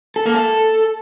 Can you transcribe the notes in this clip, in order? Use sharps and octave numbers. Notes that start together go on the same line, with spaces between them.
A4
A#3
A4